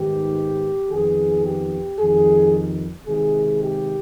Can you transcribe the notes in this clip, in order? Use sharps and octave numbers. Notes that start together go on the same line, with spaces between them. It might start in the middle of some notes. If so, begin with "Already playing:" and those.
Already playing: G#2 D#3 G3 B3 G4
F2 D#3 B3 G#4
G4
F2 D#3 G3 G#4
C3 D#3 G#3 G#4
G4